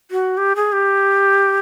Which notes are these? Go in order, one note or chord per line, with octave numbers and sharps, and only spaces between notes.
F#4
G4
G#4
G4